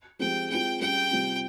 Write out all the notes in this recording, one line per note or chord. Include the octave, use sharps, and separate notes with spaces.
F3 G#3 C4 G4 G5
G#3 C4 F4 G#4 G5
G3 C#4 G#4 G5
C3 G3 C4 F4